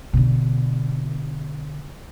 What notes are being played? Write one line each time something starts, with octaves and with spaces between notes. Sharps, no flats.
B2 D3